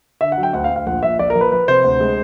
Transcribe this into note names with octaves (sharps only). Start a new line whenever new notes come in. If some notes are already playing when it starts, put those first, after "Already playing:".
D3 E5
F#5
F#3
G5
D2 F#5
F5
D2
F5
A#1 F#5
A#1 E5
A#1 D5
A#4
F3
B4
F3 B4
C3 C5
D2
G#3